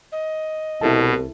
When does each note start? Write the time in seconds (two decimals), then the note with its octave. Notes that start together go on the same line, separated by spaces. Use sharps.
0.12 D#5
0.81 C2 B2 E4 A4 A5